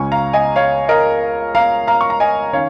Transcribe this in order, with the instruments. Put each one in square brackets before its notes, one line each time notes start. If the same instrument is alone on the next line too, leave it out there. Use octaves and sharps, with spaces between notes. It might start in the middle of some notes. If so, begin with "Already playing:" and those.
Already playing: [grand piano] C#2 C#3 G#3 C#4 G#5 C#6
F5 A#5
D#5 G#5
C#5 F5
A#4 D#5
F5 A#5
F5 A#5
C#6
A#5
D#5 G#5
D#3 C#4 C#5 F5